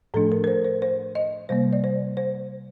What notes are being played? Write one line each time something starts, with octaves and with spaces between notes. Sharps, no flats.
A2 F3 A3 D4 A4
A#4
A#4
C5
C5
C5
D#5
C3 G3 A#3 C5
D5
C5
C5